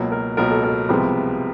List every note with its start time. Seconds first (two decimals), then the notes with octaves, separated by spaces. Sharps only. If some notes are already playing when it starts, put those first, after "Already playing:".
Already playing: C#2 B2 F#3 A#3
0.12 A#4
0.37 C#2 B2 F#3 A#3 A#4
0.50 A4
0.63 A#4
0.89 C2 C3 F3 G#3 B3